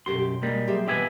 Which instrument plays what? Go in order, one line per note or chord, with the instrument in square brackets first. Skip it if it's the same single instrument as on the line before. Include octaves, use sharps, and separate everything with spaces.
[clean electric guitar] F#2 C6 [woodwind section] B2 [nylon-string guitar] F#4 G4 A4
[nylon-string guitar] G4
[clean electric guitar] G3 A#3 [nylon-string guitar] G#3 C#4
[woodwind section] F#3 C6 [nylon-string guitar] G4 G#4 E5
[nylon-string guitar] B2 B3 F4 [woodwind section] E3 [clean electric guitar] G4 E5 G#5